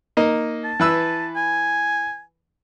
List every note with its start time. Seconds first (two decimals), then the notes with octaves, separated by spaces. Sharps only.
0.17 A#3 D#4 D#5
0.64 A5
0.80 E3 B4 E6
1.36 G#5